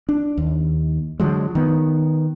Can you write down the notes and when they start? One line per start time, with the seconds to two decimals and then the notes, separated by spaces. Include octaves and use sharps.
0.09 D4
0.38 D#2
1.20 D3 F3 F#3 G#3
1.55 D#3 B3